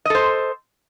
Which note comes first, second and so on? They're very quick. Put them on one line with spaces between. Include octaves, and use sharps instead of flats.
D#5 A4 C5